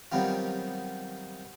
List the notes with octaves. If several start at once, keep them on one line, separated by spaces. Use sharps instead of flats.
D#3 F#3 G3 B3 C4 F4